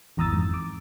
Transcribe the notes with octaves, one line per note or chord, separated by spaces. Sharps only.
G#1 E2 A#5 D#6 E6 A6
F2 G#2
D6